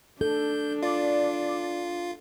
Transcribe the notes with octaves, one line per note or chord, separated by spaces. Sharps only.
D4 A4 G6
F4 D5